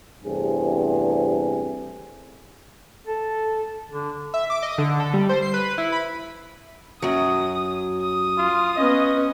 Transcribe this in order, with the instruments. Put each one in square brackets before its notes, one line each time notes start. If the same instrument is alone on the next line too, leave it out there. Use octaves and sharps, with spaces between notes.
[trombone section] E2 G2 C3 A3 C4 G#4
[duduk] A4
D3
[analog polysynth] E5
D6
D#5
D3
A4
G3
C5
C7
B4
E4
B5
[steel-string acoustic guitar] F#2 F#3 [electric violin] D#6
[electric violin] D#6
[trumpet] F4
[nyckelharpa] B3 C#4 [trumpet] D#5